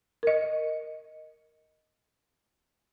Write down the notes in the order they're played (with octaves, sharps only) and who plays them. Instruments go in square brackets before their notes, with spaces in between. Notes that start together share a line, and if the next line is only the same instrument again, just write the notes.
[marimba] A#4 D#5